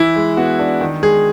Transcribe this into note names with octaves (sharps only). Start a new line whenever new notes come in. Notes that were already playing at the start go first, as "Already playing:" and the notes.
Already playing: E3 E4
G#3
B3 F#4
D4
D#3
G#3 G#4